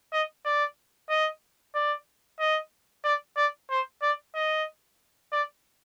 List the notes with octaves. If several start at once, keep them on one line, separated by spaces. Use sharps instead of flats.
D#5
D5
D#5
D5
D#5
D5
D5
C5
D5
D#5
D5